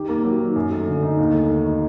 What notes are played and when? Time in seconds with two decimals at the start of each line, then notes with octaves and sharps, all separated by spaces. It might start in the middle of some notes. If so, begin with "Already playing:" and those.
Already playing: D#3 G4
0.09 A#3
0.24 F#3
0.39 D#3
0.56 F#2
0.71 A3
0.87 D3
1.03 D#4
1.19 D#2
1.34 A3
1.50 D#3
1.66 D#4